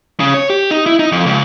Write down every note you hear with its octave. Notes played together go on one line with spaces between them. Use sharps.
C#3
C#5
G4
D#4
E4
D#4
F2
C#2